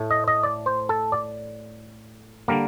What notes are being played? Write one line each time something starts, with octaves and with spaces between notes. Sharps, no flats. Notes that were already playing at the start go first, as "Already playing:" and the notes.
Already playing: A2 A3
D#5
D#5
D5
C5
A4
D5
D3 G3 A#3 A#4